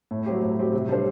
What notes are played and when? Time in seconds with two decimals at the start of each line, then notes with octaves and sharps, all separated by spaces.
0.11 A2
0.26 F#3 C4 G4
0.42 A2
0.58 F#3 C4 G4
0.73 C3
0.89 G3 D4 A4 C5